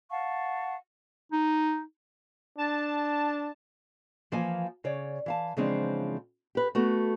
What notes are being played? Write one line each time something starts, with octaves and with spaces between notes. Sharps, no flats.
F5 F#5 A5 C#6
D#4
D4 A5
E3 F3 A#3 G#5
C#3 C#5 D5
E3 F5 A5
C#3 E3 F3 G#3 C4 D4
G4 B4
A3 B3 F#4